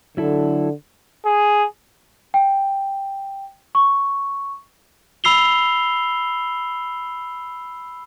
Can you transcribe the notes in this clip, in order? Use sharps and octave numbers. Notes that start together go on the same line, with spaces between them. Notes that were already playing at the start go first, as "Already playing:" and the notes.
D3 F#3 E4 A4
G#4
G5
C#6
B5 E6 C7 F7 G7